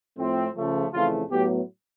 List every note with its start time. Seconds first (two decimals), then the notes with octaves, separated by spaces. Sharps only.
0.17 A2 F3 A3 C4
0.55 C#3 F3 A3
0.93 F2 C#3 E3 A3 F4
1.31 A2 F#3 B3 G4